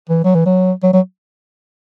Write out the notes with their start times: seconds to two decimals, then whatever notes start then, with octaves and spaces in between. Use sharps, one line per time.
0.09 E3
0.24 F#3
0.34 E3
0.46 F#3
0.83 F#3
0.93 F#3